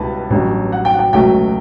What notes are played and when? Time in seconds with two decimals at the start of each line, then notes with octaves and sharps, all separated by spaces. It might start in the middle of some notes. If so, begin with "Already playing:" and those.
Already playing: C#2 B2 G3 B3 E4 A5 B5
0.30 A1 G2 F#3
0.72 F#5
0.85 G5
0.94 F#5
0.99 G5
1.13 C#2 B2 F#3 A3 G5